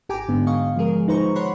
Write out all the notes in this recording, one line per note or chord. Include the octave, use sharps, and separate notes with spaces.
G#1 G4 G5 G#5 A#5 D6
G#2 D3 B3
D#5 F5 C#6
F3 G#3 G#4 A#4
D#3 D#4 B4 C5 A#5 C#6
C#5 F#5 B5 C6